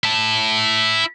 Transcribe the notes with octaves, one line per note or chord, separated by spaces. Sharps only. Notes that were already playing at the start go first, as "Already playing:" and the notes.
E4 A5